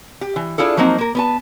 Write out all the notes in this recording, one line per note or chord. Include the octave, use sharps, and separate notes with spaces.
G4
E3
D4 E4 F4 G#4 A4
F3 F#3 A#3 C4 D#4
A#3 A#4
B3 B4 A5